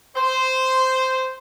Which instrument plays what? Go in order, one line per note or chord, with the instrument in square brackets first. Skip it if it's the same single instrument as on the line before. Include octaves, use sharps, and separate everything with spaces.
[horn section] C5